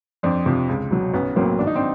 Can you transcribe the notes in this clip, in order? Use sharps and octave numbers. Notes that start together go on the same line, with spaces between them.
F2 C4 D4
C3 F3
C#2
B2 F#3
B1 B3 C#4
A2 F#3 A#3 C4
G#1 D4
D#4
C4 D4